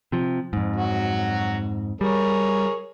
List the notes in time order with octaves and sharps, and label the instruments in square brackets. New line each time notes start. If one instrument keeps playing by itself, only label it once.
[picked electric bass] C3 F3
F2 G#2
[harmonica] F#3 F#4
[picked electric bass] G3 [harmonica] G#4 A#4 C#5